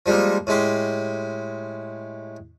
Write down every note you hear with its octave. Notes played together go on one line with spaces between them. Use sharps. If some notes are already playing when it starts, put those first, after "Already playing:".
F3 G3 G#3 A#3 D#4
A2 G#3 G4 C6